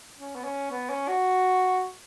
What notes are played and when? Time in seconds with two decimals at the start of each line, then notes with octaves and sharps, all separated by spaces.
0.18 C#4
0.35 B3
0.44 C#4
0.71 B3
0.90 C#4
1.08 F#4